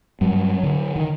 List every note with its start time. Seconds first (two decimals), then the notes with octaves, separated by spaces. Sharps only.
0.21 G2 F#3
0.63 D3
0.96 D#3